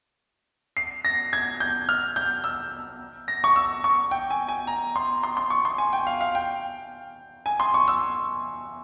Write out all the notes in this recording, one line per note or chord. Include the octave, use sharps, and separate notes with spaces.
C7
A#6
G#6
G6
F6
G6
E6
A#6
C#6
E6
C#6
G5
G#5
G#5
A#5
C6
C6
C6
C#6
C6
G#5
G5
F5
F5
G5
G#5
C6
C#6
E6